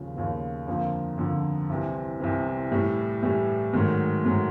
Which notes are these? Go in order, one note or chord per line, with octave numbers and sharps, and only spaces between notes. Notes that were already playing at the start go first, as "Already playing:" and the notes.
Already playing: D#2 C#3 F3
D#2 C#3 F3
F2 D3 F3 A#3
F2 D3 F3 A#3
C2 C3 E3
C2 C3 E3
A2 E3 G3
A2 E3 G3
G#2 D#3 F#3 A3
G#2 D#3 F#3 A3